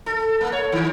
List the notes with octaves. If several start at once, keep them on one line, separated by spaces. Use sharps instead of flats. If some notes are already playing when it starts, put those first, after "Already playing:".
A4
A#3
C#5
D#3